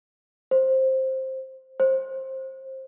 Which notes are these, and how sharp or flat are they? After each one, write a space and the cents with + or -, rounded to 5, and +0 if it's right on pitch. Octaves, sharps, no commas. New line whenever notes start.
C5 +10
C5 +20